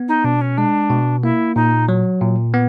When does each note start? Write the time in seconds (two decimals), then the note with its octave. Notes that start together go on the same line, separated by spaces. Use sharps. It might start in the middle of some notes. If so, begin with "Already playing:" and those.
Already playing: B3
0.08 D#4
0.24 B2 D4
0.41 C#4
0.57 G#3 D4
0.90 B2
1.22 A#3 E4
1.56 A#2 D#4
1.89 F#3
2.21 A#2
2.54 B3